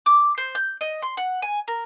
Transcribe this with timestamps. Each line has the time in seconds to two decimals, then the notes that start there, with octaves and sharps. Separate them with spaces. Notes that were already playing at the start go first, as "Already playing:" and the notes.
0.06 D6
0.38 C5
0.55 G6
0.81 D#5
1.02 C6
1.17 F#5
1.42 G#5
1.68 A#4